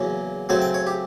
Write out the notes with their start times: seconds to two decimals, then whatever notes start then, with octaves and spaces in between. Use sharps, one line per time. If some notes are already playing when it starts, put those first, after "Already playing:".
Already playing: E2 C#3 F#3 A#3 C#4
0.49 C#3 F#3 A3 C4 G#5
0.62 G5
0.74 C#5
0.87 G4